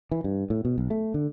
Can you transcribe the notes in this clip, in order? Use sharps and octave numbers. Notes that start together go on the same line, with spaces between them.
E3
G2
A2
B2
B1
A3
D3